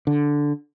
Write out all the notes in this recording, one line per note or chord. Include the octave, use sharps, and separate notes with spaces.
D3